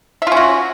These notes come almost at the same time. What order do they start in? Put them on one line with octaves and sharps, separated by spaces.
E5 F4 C#4 F#4